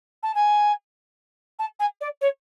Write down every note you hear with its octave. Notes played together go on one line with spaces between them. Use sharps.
A5
G#5
A5
G#5
D5
C#5